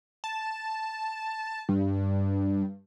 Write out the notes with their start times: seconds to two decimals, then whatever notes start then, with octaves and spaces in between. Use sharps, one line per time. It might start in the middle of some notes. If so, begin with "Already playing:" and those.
0.24 A5
1.69 G2